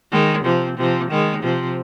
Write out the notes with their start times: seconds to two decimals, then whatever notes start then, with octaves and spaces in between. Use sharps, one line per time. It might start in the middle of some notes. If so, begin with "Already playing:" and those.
0.12 D#3 G#3
0.44 C3 F3
0.78 C3 F3
1.10 D#3 G#3
1.43 C3 F3